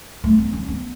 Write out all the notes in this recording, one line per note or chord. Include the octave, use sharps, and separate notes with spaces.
A3
B3
C#4
B3